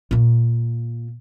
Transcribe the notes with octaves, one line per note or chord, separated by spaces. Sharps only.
A#2 A#3